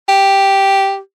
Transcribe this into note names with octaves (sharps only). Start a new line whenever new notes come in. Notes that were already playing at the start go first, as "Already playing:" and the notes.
G4